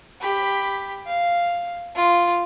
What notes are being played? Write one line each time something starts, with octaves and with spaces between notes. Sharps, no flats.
G4 B5
F5
F4